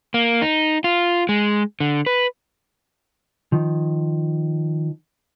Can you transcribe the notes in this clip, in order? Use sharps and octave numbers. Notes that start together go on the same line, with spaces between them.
A#3
D#4
F4
G#3
D3
B4
D#3 F3